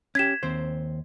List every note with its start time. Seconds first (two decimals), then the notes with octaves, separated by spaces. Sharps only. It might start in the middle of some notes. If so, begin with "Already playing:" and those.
0.15 C#4 G4 G#6 B6 E7
0.43 D#2 C4 C5